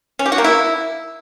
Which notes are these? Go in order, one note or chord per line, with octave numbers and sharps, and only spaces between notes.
C#4
G4
F#4
A#3
E4